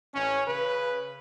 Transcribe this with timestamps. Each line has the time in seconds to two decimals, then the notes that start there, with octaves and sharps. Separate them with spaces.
0.14 A1 C#4
0.47 C#3 B4